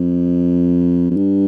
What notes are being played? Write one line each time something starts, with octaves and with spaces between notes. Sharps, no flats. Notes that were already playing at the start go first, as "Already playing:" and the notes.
Already playing: F2
F2
G2